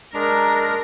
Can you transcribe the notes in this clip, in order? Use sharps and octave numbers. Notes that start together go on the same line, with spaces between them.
G#3 D4 A#4 A#5